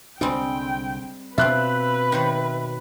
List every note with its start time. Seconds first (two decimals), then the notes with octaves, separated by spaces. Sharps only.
0.21 C2 D3 G3 G#3 C4 D4 G5
1.38 B2 C4 D4 F4 B4 E5 F#6
2.12 D#3 C5 C#5